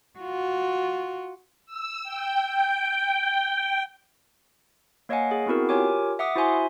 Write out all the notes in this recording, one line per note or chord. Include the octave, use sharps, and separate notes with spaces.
F4 F#4
E6
G5
G5
A#3 C#5 D#5 F5 F#5 G#5
G#4
B3 C4 E4 F#4 A#4
F4 G4 A#4 C#5 G#5 D6
E5 F#5 D6 D#6
E4 F#4 C5 E5 G#5 C6